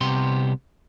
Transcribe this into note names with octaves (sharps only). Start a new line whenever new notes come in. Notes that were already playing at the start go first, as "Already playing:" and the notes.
C2 C3 B3 G4 C6